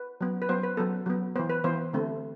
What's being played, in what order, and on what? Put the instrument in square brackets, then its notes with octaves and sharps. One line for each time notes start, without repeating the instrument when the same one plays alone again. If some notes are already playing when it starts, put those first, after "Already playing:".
Already playing: [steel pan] B4
F#3 B3
B4
F#3 B3 C5
B4
F#3 B3 A4
F#3 B3
E3 B3 C5
B4
E3 B3 C5
D3 A3 C4